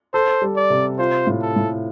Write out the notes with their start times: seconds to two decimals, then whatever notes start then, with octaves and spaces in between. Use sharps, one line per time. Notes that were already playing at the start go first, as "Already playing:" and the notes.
0.14 A4 C5
0.42 G3
0.56 D5
0.70 C3
0.98 F4 C5
1.27 A2
1.42 A4
1.56 A2